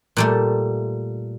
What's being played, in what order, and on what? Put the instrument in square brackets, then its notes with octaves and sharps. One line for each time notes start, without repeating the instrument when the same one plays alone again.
[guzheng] A#2 G3 A3